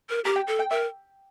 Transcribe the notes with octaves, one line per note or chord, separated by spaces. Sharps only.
A#4
G4 A#4
G5
A4
G5
A#4 E5